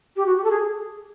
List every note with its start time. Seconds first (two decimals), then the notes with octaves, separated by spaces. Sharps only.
0.16 G4
0.25 F#4
0.36 G4
0.43 A4
0.50 G#4